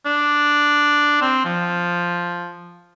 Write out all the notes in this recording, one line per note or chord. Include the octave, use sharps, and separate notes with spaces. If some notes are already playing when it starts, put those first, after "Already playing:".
D4
C4
F3